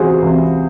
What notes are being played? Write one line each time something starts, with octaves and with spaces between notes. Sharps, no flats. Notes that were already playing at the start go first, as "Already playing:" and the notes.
Already playing: C#2 C3 E3 F#4 G#4 C5
C#2 C3 E3